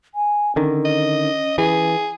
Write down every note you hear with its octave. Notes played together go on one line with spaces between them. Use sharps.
G#5
D3 D#3 C#4
D#5
E3 G#4